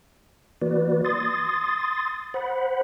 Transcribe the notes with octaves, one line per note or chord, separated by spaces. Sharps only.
E3 A#3 F#4 B4 D5
C6 D#6 A6
C5 F#5 B5